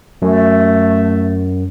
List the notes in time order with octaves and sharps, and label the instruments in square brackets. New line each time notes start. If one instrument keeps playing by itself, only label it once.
[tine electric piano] F#2 [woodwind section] A3